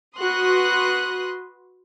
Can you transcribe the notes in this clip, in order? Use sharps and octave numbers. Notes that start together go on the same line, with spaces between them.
F#4 B4 C6 D#6 F#6